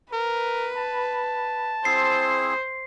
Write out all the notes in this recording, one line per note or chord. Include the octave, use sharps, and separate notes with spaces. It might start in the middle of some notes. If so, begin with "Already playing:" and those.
A#4 B4
A5
C4 E4 G#4 C5 C7